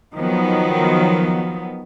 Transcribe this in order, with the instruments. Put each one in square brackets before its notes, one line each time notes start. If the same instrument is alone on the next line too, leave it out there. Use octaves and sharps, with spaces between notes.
[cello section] D#3 F3 F#3 B3